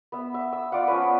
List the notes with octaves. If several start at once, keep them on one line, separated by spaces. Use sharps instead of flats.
B3 E5
E5
E6
F4 D5 F5 F#5
F3 C#4 B4
B3